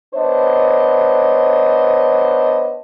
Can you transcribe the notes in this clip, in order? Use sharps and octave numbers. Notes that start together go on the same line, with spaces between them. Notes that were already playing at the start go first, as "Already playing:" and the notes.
B3 D4 C5 C#5 D#5